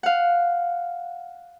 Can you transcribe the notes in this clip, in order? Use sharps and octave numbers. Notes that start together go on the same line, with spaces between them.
F5 F#5